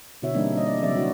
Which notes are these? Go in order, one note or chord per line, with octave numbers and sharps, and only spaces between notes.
B2 D3 E4 F#4 C#5 E5
E3 G3 A#3 C4 D4 D#4
G3 C#4 D#5
D5
C#3 E3 F#3 C4 D5 E5
C#4 D4 E4 F#4